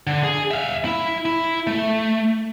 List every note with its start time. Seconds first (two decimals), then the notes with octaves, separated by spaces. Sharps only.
0.07 D3
0.24 G#4
0.51 E5 F5
0.85 E4
1.25 E4
1.67 A3